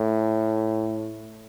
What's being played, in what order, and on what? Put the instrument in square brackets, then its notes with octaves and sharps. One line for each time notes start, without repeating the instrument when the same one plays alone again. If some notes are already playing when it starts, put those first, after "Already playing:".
Already playing: [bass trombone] A2